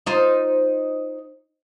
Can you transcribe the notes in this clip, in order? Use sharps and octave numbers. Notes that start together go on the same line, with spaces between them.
D#4 F4 C5